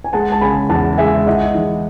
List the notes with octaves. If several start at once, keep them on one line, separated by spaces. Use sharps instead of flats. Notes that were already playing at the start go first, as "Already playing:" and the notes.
G#5
G#3 F#5 A5
A5
C#3 G#5 B5
E2 F#5 A5
G#3 E5 G#5
E4 D#5 F#5
E3